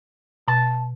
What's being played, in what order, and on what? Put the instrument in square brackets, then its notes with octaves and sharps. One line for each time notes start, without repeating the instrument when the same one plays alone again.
[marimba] B2 [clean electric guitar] A5